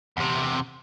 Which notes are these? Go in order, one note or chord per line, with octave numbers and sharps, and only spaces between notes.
E2 C3